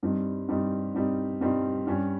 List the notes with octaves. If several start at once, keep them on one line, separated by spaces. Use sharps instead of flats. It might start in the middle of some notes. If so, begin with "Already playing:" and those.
G2 G3 C4 D#4
G2 G3 C4 D#4
G2 G3 C4 D#4
G2 G3 C4 D#4
G2 G3 C#4